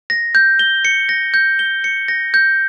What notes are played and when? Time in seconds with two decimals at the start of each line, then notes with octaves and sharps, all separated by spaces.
0.10 A#6
0.35 G6
0.59 G7
0.85 C#7
1.09 A#6
1.34 G6
1.59 G7
1.84 C#7
2.08 A#6
2.34 G6